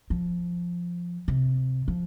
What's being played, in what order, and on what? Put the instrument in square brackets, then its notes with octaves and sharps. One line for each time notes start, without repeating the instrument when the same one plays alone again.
[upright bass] F3
C3
F3